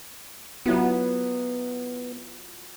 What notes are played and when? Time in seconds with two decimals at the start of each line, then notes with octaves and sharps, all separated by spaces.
0.66 F#3 B3 E4 F4